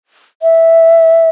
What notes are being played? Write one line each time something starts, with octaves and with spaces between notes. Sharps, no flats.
E5